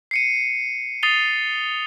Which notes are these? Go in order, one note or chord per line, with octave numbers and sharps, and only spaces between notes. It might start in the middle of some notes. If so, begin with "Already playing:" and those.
C7 C#7 D#7
D#6 A6 C7 D#7 F7 G7